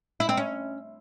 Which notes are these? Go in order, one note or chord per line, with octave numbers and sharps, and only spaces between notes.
E4
C4
C#4